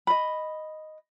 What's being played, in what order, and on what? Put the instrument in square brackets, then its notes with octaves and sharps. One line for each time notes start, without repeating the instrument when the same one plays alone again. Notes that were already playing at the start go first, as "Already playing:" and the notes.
[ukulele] D#5 B5